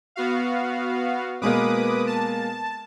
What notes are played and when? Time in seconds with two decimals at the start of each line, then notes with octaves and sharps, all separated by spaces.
0.16 B3 F#4 F5
1.41 B2 G#3 A#3 B4 D6 D#6
2.07 A5